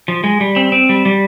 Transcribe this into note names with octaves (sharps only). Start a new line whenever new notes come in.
F3
G#3
G3
C4
C4
G3
G3